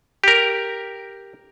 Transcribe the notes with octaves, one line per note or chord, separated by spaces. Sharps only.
G4 A#4